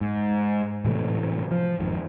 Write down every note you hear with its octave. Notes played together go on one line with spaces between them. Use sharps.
G#2
A2 C3 E3 A3
F3
G#1 F2 D#3